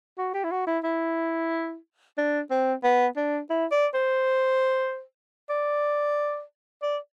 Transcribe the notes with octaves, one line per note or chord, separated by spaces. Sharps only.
F#4
G4
E4
F#4
E4
E4
D4
C4
B3
D4
E4
D5
C5
D5
D5